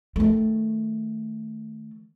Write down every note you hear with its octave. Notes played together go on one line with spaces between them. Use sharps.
D#3 A3